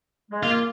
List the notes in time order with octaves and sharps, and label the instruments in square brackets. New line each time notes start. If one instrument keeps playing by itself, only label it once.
[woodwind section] G#3
[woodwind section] A#3 [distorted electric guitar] F4